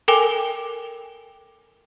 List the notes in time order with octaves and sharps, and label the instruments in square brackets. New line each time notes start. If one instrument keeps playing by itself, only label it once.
[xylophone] A4 A#4 G5 G#5 D6 G7